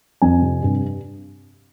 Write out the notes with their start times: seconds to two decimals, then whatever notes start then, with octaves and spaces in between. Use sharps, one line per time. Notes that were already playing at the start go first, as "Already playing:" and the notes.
0.22 F2 G#5
0.42 C3
0.63 G2